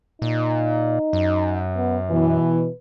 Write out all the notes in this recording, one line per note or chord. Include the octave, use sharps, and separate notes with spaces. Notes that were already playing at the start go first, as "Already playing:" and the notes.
A#2 D#4
F#2
B3
B2 E3 B4